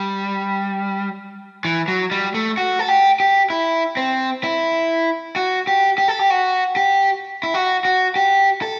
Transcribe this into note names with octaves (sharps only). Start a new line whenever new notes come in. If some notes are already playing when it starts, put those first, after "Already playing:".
Already playing: G3
E3
F#3
G3
A3
F#4
A4
G4
G4
E4
C4
E4
F#4
G4
G4
A4
G4
F#4
G4
E4
F#4
F#4
G4
A4